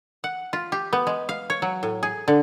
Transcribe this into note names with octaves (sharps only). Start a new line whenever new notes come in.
F#5
F4
G4
B3
G#3
F5
C#5
F#3
A2
G#4
D3